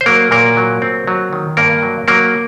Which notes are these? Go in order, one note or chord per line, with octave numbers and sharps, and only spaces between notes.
C5
F#3 A#3 A#4
A#2 A#3 A#4
F#3
C4
F#3
D#3
G2 A#3 A#4
F#3
F#3 A#3 A#4